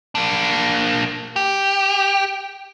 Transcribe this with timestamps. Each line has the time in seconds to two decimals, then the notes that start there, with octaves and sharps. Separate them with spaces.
0.15 A#3 D4
1.36 G4